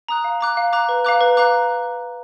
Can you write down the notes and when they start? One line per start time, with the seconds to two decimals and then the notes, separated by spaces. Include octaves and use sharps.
0.08 A#5 D#6 F#6
0.24 F5
0.41 A#5 D6 F#6
0.57 F5
0.73 A#5 D6 F#6
0.89 B4
1.05 F5 A#5 D6 F#6
1.21 B4
1.37 F5 A#5 D6 F#6